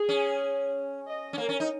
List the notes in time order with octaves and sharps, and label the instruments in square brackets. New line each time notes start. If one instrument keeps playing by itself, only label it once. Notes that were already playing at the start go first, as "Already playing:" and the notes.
Already playing: [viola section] G#4
[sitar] C#4
[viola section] D#5
[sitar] C#4
[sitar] A#3 [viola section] A#4
[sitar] C#4
D#4